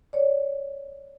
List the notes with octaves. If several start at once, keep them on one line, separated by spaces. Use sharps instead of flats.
C#5 D5